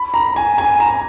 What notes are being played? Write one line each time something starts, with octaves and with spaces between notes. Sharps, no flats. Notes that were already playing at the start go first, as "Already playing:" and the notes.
Already playing: B5
A#5
G#5
G#5
A#5